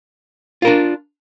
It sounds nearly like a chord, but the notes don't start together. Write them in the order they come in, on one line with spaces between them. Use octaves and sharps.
F4 A#4 D4